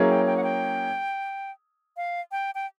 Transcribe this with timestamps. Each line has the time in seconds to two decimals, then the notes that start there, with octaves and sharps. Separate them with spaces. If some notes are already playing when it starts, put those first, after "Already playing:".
Already playing: F#3 A#3 C#4 E4 G#4
0.10 G5
0.26 G5
0.37 F#5
0.43 G5
1.97 F5
2.32 G5
2.55 G5